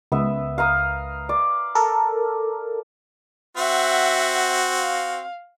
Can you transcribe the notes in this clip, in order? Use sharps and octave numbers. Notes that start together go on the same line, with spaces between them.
C#2 B3 E5
F5 A#5 D#6
D5
A4 A#4
C4 F#4 E5 F#5
F5